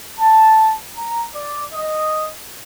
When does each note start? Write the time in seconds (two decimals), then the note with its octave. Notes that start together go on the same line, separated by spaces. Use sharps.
0.20 A5
0.96 A#5
1.35 D5
1.73 D#5